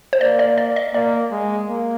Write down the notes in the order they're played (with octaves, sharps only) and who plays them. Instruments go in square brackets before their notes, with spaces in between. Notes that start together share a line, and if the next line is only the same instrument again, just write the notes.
[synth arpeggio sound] C5
[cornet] A#3 [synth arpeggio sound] D5
[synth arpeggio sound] D5
D5
D#5
[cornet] A#3 [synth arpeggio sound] D5
[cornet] G#3
A#3